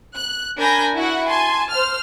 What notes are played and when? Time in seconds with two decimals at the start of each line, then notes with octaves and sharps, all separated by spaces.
0.15 F#6
0.58 D4 A#4 G#5 B5 G6 A#6
0.95 E4 F#4 F#5
1.27 G#5 A5 C6
1.70 C5 F6